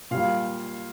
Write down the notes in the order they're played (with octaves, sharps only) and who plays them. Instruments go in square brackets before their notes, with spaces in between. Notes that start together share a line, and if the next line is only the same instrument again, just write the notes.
[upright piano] A#2 G3 F5